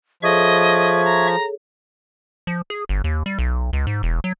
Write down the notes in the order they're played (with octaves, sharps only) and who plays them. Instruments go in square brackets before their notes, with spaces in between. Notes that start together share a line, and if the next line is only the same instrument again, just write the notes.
[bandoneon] F3 [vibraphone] G#4 A4 C#5 [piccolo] D#5 [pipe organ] E5 C#6 G#6
[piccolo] A#5
[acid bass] F3
G#4
G1
D#2
G3
B1
C#2
G#2
E1
F#3